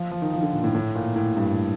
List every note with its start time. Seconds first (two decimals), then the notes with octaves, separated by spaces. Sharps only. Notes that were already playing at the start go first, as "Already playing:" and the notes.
Already playing: F3
0.11 F3
0.22 D#3
0.33 F3
0.38 D#3
0.43 D3
0.53 A#2
0.64 A2
0.74 A2
0.95 A#2
1.16 A2
1.37 G2